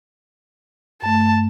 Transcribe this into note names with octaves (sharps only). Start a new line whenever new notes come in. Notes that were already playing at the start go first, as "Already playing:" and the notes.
G2 A3 A5